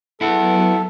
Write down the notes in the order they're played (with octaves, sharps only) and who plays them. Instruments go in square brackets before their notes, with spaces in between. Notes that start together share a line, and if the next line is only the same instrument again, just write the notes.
[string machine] F#3 B3 [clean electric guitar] E4 F#5 [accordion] A4